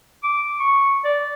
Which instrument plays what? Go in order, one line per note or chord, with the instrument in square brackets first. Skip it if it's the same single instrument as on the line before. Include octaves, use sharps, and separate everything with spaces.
[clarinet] D6
C#6
D5